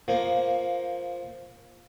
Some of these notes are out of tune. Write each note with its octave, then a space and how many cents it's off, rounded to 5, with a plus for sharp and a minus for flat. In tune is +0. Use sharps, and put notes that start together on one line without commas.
F3 +0 A#3 +10